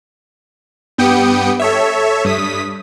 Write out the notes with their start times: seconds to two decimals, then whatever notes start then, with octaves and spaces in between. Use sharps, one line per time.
0.98 G2 B3 G4 G5 D#6 C#7
1.60 A4 C#5 E5
2.25 G2 D#6 B6